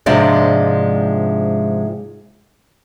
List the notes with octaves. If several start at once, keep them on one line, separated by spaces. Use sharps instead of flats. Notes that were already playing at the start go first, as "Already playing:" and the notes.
G#2 C3 F3 G#3 D4 D5